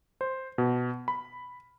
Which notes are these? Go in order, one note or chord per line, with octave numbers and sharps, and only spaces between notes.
C5
B2
B5